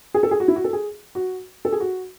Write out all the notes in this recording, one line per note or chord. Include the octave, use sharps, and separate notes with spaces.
G#4
A4
G#4
F#4
E4
F#4
A4
G#4
F#4
A4
G#4
F#4